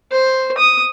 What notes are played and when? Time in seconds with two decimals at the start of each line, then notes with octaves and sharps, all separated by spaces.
0.12 C5
0.57 D#6